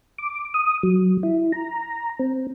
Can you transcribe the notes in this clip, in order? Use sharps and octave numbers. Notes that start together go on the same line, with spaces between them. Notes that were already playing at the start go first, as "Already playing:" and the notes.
D6
D#6
F#3
E4
A#5
C4